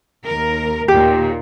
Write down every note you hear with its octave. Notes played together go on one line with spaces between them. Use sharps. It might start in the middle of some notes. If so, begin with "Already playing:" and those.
D#2 A#4
D#2 A#2 G4